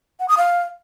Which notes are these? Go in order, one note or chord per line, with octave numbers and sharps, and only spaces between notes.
F#5
D#6
F5